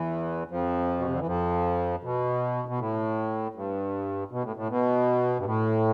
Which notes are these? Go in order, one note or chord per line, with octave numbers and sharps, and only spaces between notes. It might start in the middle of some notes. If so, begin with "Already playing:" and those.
Already playing: E2 E3
F2 F3
B2
C3
D3
E3
F2 F3
B2
B2
A2
G2
B2
A2
A2
B2
G2
A2